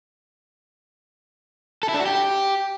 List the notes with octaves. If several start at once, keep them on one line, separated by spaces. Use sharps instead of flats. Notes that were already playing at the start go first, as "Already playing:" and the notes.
A4
E4
D4
F#4
G4